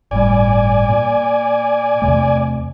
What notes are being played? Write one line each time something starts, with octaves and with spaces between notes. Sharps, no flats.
G1 A2 G3 D5 G#5
A#2
E2 C3 A3